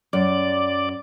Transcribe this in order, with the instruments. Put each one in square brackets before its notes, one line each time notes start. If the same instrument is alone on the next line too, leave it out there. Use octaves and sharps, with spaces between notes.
[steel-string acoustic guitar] F#2 [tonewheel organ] D5